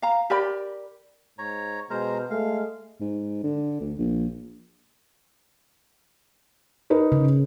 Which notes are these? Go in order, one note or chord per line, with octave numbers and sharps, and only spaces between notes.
F5 A#5
G4 A#4 D5 B5
G#2 C#5 A#5
B2 G#3 A#4 C5 A#5
G#3 A3 F5
G#2
D3
D2
A#1
D#4 A#4 B4
C#3